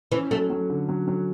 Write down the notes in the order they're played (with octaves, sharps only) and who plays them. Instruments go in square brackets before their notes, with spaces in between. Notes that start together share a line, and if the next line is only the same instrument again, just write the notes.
[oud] E3 [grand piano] C#4
[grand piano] F#3 [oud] A3
[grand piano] F#3
D3
F#3
F#3